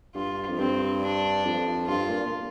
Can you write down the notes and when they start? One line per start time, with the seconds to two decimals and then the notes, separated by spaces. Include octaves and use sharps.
0.14 G2 F4
0.49 F2
0.58 G2 C4
1.01 D4
1.45 F2
1.87 G2 F4
2.09 A#2
2.26 A#2